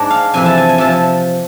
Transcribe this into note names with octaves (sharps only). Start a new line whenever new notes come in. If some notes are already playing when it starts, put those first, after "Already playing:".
Already playing: G#2 G#3 D4
F5
F2 C3 E3 G#5
A5
G#5
G#5
C3 F3 A5